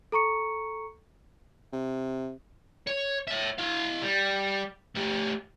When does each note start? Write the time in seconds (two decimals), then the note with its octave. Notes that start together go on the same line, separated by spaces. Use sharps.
0.12 A4 A#5 C#6 C#7
1.73 C3
2.87 C#5
3.27 C#5 E5
3.58 E4 F5
4.02 G3
4.95 A3 G4